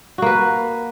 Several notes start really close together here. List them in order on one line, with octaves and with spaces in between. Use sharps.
F#4 A#3 B4